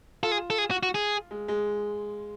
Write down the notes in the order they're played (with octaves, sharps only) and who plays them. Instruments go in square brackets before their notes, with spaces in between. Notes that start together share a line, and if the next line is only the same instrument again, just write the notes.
[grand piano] F4 [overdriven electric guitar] A4
[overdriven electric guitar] G#4
A4
G#4
F#4
F#4
G#4
[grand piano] G#3
G#3